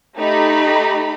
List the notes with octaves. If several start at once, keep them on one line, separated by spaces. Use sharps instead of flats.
A3 D#4 G4 B5